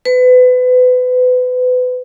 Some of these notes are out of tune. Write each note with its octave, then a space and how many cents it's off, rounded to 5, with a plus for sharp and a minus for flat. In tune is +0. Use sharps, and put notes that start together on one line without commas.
B4 +30